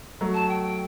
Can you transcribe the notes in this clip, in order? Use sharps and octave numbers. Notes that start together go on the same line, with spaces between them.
F#3 A3
A5
G5
G5